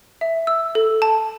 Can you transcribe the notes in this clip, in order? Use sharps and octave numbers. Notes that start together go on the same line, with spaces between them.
E5
E6
A4
A5